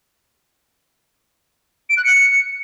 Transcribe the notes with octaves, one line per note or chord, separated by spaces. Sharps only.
D7
F#6
C#7